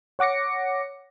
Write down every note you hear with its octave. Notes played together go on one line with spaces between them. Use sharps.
C#5 F#5 D6 A#6 C#7